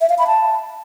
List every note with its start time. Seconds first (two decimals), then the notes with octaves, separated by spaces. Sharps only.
0.01 E5
0.10 F5
0.18 B5
0.27 A5